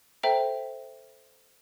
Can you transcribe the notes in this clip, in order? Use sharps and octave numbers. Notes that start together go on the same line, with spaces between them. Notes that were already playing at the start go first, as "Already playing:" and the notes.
A4 C5 E5 G5 A#5